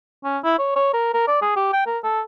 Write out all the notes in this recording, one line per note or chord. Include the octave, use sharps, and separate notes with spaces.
C#4
E4
C#5
C#5
A#4
A#4
D5
G#4
G4
G5
A#4
A4